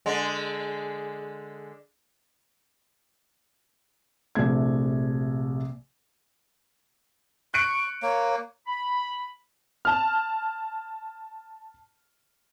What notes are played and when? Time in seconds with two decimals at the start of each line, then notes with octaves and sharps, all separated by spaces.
0.06 D3 G#3
4.35 A#1 C3 A3 G#6
7.54 C#6 F#6 C#7 D7
8.02 A#3 C#5
8.66 B5
9.85 A5 F6